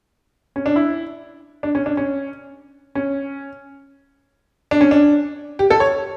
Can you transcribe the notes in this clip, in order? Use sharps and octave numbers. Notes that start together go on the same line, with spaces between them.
C#4
D4
E4
D4
C#4
D4
C#4
C#4
D4
C#4
D4
G4
A4
C#5